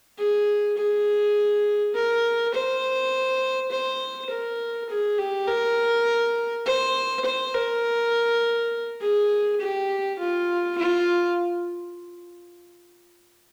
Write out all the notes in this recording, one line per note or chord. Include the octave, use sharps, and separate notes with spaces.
G#4
G#4
A#4
C5
C5
A#4
G#4
G4
A#4
C5
C5
A#4
G#4
G4
F4
F4